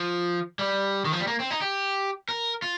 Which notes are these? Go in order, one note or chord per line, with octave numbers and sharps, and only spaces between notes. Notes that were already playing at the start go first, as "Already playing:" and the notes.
Already playing: F3
G3
D#3
F3
G3
A#3
C4
D#4
G4
A#4
F4